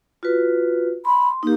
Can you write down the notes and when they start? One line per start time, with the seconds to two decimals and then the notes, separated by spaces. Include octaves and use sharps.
0.23 F4 F#4 B4
1.05 B5 C6
1.43 A#3 D#4 G4